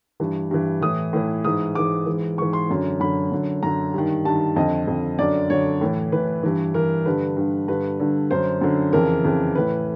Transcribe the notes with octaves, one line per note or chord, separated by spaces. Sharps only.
G2 E3
G2 E3
A2 E3 D#6
A2 E3
G#2 E3 D#6
G#2 E3 D6
G#2 E3
G#2 E3 C#6
C6
F#2 D3
F#2 D3 B5
F#2 D3
F#2 D3 A#5
G2 D#3
G2 D#3 A5
F2 D3 D#5
F2 D3
F#2 D3 D5
F#2 D3 C#5
A2 E3
A2 E3 B4
G2 E3
G2 E3 A#4
G2 D3 B4
G2 D3
G2 D3 B4
G2 D3
F#2 D3 C5
F#2 D3
F2 C#3 E3 A#4
F2 C#3 E3
A2 E3 B4